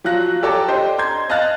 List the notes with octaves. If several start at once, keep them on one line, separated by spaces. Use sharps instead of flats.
F3 F#3 F4 F#6 A#6
G4 A4 C#5 A5 A#5 D6
D4 G4 C5 D#5
A#5 C6 G6 G#6
D#5 F5 A5 F6 F#6 A6